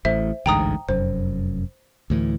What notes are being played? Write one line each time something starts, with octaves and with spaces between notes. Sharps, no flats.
A1 A2 C5 E5
A1 D2 G#2 G5 A#5 D#6
F1 F#2 C5
D2 A2 E3